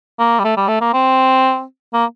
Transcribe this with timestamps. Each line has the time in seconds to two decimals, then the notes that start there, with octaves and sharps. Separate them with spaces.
0.19 A#3
0.39 G3
0.44 A3
0.57 G3
0.68 A3
0.81 A#3
0.93 C4
1.93 A#3